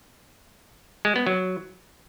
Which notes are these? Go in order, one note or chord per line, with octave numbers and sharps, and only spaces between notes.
G#3
B3
F#3